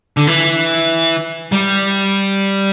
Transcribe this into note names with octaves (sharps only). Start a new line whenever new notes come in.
D3
E3
G3